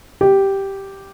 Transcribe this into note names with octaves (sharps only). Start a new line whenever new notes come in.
G4